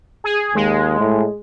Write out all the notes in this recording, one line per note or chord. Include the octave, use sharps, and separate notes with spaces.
G#4
D#2 G#3
A2